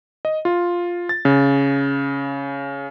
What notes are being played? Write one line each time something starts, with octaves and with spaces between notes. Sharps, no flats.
D#5
F4
A6
C#3